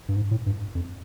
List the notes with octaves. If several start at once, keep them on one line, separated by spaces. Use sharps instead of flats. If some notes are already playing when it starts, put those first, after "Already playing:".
G2
G#2
A2
G2
F2